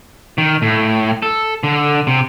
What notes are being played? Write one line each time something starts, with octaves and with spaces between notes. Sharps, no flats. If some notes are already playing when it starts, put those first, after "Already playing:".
D#3
A2
A4
D3
C3